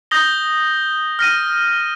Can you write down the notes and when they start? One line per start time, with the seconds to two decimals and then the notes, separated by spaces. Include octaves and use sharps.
0.11 D#6 G6 A#6 G7
1.19 F6 A#6 D#7